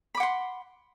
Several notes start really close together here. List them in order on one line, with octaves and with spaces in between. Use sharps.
B5 D6 F#5 C6